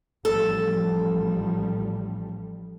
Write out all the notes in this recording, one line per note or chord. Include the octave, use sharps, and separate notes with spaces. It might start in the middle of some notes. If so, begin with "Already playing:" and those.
A1 F3 G3 A4